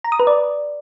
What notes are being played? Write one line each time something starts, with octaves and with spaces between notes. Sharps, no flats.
A#5
D#6
B4
D5